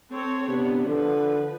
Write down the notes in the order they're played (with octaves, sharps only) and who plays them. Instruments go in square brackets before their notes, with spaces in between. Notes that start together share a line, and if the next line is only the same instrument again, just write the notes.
[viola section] C4 A4 C#5
[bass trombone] C3 [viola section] B3 D4
[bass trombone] D3 [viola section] F3 B4